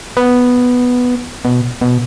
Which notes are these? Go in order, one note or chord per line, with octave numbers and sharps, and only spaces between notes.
B3
B2
B2